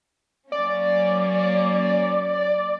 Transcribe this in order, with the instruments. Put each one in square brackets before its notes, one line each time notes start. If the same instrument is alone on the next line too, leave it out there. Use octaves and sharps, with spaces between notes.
[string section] F#3 A#3 C#4 [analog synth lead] D5